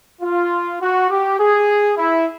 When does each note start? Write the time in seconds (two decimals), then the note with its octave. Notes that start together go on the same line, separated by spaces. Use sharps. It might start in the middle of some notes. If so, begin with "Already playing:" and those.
0.21 F4
0.80 F#4
1.10 G4
1.39 G#4
1.97 E4